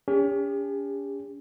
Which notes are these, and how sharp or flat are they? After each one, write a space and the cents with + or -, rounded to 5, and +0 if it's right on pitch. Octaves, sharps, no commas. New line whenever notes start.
C#4 +40 G4 +45